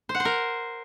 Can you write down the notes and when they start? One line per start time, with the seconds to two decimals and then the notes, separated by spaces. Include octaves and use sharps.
0.09 C5
0.15 F#5
0.20 C5
0.25 A#4